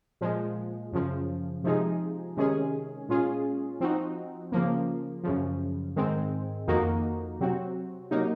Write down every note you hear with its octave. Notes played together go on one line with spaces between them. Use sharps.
A#2 F3 G#3
F#2 C#3 F3
C3 F3 G#3 D#4 G#4
C3 D#3 G#3 C#4 G#4
A#2 G#3 C#4 F4 G#4
F3 C4 D#4 F#4
C#3 F3 A#3
F#2 C#3 F3
G#2 D#3 G#3 C4
F2 D#3 A#3 D#4 F#4
C3 F#3 C4 F#4
C3 F#3 A#3 D#4